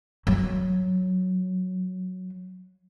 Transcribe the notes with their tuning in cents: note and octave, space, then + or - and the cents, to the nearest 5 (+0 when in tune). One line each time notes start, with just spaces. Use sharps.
F#3 -5